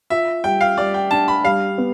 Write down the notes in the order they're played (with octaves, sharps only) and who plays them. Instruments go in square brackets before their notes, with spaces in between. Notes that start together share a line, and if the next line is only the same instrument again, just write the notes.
[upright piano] F4 [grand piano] E5
[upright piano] G3 [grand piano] G5
[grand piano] F5
[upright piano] G3 [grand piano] D5
[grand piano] G5
[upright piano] D4 [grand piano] A5
[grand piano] B5
[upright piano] G3 [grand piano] F5
[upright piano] B3